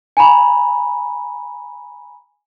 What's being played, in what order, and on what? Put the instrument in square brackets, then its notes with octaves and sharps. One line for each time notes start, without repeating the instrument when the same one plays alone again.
[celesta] G#5 A#5 B5